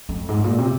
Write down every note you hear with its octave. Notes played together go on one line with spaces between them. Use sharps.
F2
G#2
A#2
C3